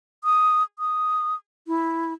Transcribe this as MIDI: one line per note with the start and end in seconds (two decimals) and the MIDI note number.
0.24 0.63 87
0.79 1.35 87
1.67 2.13 64